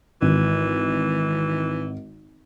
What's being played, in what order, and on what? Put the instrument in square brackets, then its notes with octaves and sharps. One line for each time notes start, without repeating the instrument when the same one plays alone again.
[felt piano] G#1 [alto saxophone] E3